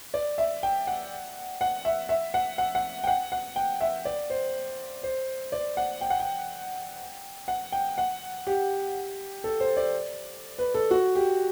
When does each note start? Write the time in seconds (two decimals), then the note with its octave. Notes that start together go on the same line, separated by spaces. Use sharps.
0.14 D5
0.38 E5
0.63 G5
0.87 F#5
1.61 F#5
1.85 E5
2.09 E5
2.34 F#5
2.58 F#5
2.75 F#5
3.04 G5
3.07 F#5
3.32 F#5
3.56 G5
3.81 E5
4.05 D5
4.30 C5
5.03 C5
5.52 D5
5.77 F#5
6.01 G5
6.10 F#5
6.20 G5
7.48 F#5
7.72 G5
7.98 F#5
8.47 G4
9.44 A4
9.60 C5
9.77 D5
10.58 B4
10.74 A4
10.91 F#4
11.15 G4